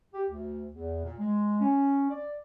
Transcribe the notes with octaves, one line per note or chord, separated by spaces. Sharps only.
G4
D2
E2
A#2
G#3
C#4
D5